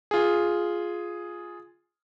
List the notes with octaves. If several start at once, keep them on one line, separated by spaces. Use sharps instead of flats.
F4 G#4